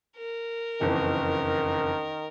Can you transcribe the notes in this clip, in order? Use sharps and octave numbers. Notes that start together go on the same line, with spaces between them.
A#4
F#1 F2 D#3 E3